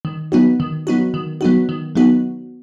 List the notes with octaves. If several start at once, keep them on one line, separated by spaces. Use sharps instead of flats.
D#3
F#3 B3 D#4 F#4
D#3
F#3 B3 D#4 F#4
D#3
F#3 B3 D#4 F#4
D#3
F#3 B3 D#4 F#4